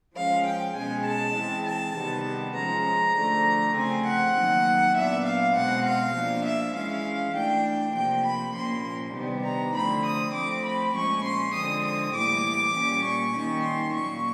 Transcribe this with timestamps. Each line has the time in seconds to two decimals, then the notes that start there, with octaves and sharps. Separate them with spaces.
0.16 F3 G#3 C#4 F5
0.46 G5
0.75 B2 G#3 C#4 G#5
1.06 A5
1.35 E3 G#3 C4
1.66 A5
1.96 C3 D#3 G3 B3
2.55 F3 G#3 C#4 A#5
3.15 D3 F3 A3 D4
3.75 C#3 F3 A3 C4 G#5
4.05 F#5
4.35 D#3 F#3 A#3
4.95 A#2 F#3 B3 D4 E5
5.25 F5
5.55 B2 G#3 C4 F#5
5.85 F5
6.15 F3 A#3 D4
6.44 E5
6.75 E3 G#3 C#4 F5
7.35 E3 A3 D4 G5
7.94 C3 F3 A#3 G5
8.24 B5
8.54 A#2 F3 A#3 C#4 C6
9.14 C3 D#3 G3 B3 D4
9.44 A#5
9.75 D3 F3 A3 C4 B5
10.05 D#6
10.34 F3 A3 C4 D6
10.64 B5
10.94 A#2 F3 G#3 C#4 C#6
11.24 C6
11.54 D3 F3 G#3 C4 D#6
11.84 D#6
12.14 A2 E3 G3 A#3 D6
12.74 A#2 G3 A#3 C#4
13.04 C#6
13.34 D#3 G3 A#3 C#4
13.64 C6
13.94 A#2 F#3 A#3 C#6